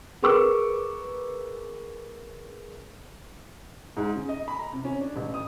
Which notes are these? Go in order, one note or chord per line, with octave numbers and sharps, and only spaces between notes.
G#4 A#4 B4 C#6 D6 E6
G#2
C#3
D#5
B5
A#5
C3
C#4
D4
A1
D#6